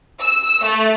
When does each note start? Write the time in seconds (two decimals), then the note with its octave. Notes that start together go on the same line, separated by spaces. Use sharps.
0.20 E6
0.63 A3